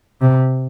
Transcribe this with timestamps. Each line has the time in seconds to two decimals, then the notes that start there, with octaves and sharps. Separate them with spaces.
0.21 C3